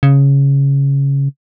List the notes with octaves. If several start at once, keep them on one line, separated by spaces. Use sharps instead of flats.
C#3